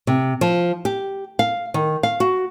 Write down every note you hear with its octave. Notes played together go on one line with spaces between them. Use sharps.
C3
F3
G4
F5
D#3
F5
F#4